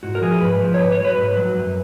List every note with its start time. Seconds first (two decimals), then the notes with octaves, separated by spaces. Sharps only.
0.03 G#2 F#4
0.15 A#4
0.22 F3 G#4
0.41 G#2 B4
0.61 F3
0.74 C#5
0.79 G#2 B4
0.92 C#5
0.98 F#3
1.05 B4
1.18 G#2
1.36 F#3
1.56 F#2